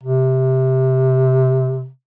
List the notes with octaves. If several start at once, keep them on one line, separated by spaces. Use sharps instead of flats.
C3